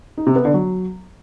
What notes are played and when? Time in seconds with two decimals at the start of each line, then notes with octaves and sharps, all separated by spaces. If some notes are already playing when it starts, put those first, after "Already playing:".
0.17 D#4
0.27 C3
0.36 B3
0.45 D3
0.54 F#3